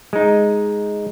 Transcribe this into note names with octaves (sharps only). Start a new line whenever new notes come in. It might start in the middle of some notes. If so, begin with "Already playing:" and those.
G#3 D#4